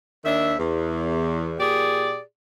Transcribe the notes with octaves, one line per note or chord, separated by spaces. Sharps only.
D#2 D#3 D4 E5
E2
A#2 G4 G#4 D5